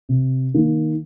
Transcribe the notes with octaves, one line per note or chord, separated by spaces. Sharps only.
C3
D#3 A#3